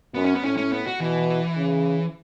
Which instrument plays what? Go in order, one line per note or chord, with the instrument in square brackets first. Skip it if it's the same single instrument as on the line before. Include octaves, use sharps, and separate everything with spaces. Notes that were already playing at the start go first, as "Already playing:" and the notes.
[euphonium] F#2 [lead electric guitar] B3
[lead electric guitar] C#4
B3
[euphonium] A2 [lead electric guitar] C#4
[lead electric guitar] C#4
B3
F#4
[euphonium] B2 [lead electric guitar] E3
[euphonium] C#3